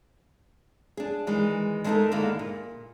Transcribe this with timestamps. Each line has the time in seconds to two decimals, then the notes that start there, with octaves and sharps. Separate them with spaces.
0.97 D4 G#4
1.27 D#3 E3 G#3
1.84 G#3 A3 B3 D#4 A4 A#4
2.11 D3 D#3 G#3 A#3 E4
2.39 A#2